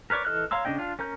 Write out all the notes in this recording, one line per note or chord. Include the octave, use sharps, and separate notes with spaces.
A#4 B4 C#5 D5 C#6
E3 A4 D#5 F6 F#6
C#5 F5 A#5 C6 E6
C#3 A#3 D4 D#5 G5
D4 F4
C#4 A#4 A#5 G6